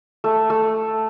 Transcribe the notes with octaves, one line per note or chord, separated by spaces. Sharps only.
A3
A3